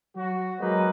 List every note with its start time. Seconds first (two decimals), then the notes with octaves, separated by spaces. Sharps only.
0.16 F#3 F#4
0.60 F#3 G#3 A#3 D#4 B4